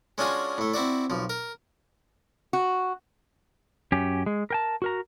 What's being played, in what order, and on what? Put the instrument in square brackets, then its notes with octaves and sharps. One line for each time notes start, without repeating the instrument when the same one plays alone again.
[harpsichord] G#3 C#4 D4 F4 F#4 G#4
A2 A3
C4 E4 F#4 D5
B1 F3
A#4
[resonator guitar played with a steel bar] F#4
[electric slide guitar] F#2 C#4 G4
G#3
A#4 G5 A5
F#4 A#4 A#5